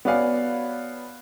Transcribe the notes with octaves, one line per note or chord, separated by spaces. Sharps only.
B3 F#4 C#5 D5 F5 G#5